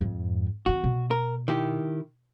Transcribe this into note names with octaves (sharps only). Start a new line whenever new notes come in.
F2 G#2
E3 C4 F#4
B2
A#4
D#3 E4 G4